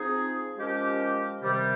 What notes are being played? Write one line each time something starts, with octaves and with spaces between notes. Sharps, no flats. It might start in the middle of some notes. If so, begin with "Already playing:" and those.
Already playing: F3 C4 D#4 G#4
F3 G#3 C#4 G4 A#4
C3 D#3 G3